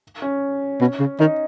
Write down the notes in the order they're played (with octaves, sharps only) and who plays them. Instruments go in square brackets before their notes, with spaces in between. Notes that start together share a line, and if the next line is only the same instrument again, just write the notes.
[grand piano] C#4
[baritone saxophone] B2
C#3
[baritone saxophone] D#3 [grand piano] D#4